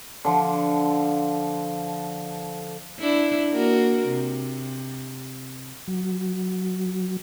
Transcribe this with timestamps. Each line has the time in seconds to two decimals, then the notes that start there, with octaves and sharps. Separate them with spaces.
0.25 D3 F3
2.99 D4 E4
3.53 A#3 F#4 A#4
4.08 C3
5.88 F#3